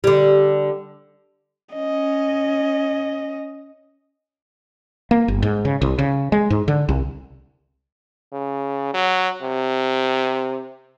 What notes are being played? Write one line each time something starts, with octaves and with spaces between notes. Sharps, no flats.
D3 G3
C#4 D#5
A#3
G1
G#2
C#3
C2
C#3
G#3
G#2
D3
C2
C#3
F#3
C3